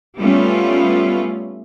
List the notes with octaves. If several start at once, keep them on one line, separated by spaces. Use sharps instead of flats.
G3 A3 B3 C#4 F4